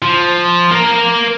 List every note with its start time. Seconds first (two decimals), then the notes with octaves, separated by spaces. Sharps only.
0.02 F3
0.71 A#3 A#4